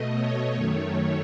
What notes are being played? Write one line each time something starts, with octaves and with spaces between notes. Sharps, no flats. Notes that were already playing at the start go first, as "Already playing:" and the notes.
Already playing: B2 A3 D#5
C#5
F#2 D#3 A3